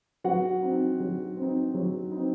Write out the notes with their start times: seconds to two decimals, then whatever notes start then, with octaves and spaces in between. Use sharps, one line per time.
0.24 F#3 F#4 F#5
0.62 C4 D#4
1.00 F#3
1.36 C4 D#4
1.74 F#3
2.11 D#4
2.17 C4